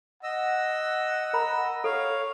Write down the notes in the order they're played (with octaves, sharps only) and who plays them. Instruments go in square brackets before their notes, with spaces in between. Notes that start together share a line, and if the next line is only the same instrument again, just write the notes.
[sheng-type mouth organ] D#5 E6 [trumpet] F#5
[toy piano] A#4 A#5 B5
[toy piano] A4 [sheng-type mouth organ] C#5 F5